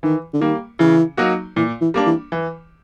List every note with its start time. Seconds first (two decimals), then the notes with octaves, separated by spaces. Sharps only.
0.03 D#3 E3
0.33 D3
0.41 D#3 G3 A#3
0.79 C#3 E3
1.17 F#3 A#3 D#4 F#4
1.56 A#2 E3
1.81 E3
1.94 G3 A#3 D4
2.07 E3
2.32 E3